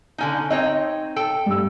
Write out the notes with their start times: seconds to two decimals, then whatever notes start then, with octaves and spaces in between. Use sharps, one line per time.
0.18 D3 C#4 D#4
0.50 C4 D#4 C#5 D#5
1.16 A4 G5
1.46 G2 E6